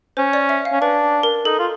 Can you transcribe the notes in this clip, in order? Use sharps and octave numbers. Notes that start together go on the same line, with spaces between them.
C#4 C5
D5
E5
F5
C#4
D4 B4
A#4
D#4 A4
F4